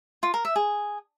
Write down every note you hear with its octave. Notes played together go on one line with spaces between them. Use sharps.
F4
A#4
E5
G#4